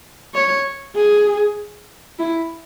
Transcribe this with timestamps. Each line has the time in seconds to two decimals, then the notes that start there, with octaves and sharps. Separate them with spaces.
0.35 C#5
0.96 G#4
2.19 E4